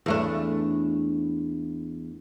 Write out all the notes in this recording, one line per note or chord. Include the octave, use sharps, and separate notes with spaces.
E2 A3 D4